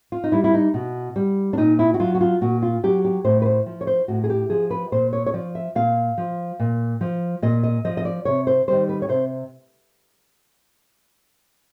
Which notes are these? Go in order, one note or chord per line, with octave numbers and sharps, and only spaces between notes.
F4
D#4
G3 E4
E4
D#4
B2
G3
D4
A#2 D#4
E4
F#4
F#3 F4
F#4
F4
A#2 F#4
F4
F#3 G4
G4
A2 C5
B4
C5
F3
C#5
C5
A2 F#4
G#4
G4
F3 G#4
B4
A#2 C5
C#5
C#5
F3 D5
E5
A#2 F5
F3
A#2
F3
A#2 D#5
D#5
F3 D#5
D#5
D5
C3 C#5
C5
D#3 G3 C5
B4
C#5
C3 C5